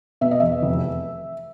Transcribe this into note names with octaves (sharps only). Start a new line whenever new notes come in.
B2 E5
D#5
E2 E5
F1